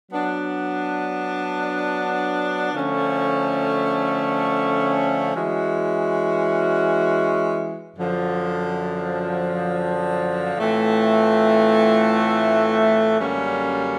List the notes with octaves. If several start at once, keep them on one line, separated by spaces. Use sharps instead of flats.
F#3 B3 D4
D3 F3 A3 C#4
E3 G#3 C#4 F#4
F#2 D3 F3
A2 E3 A3 C4 F4
F#2 D3 G3 A#3 C#4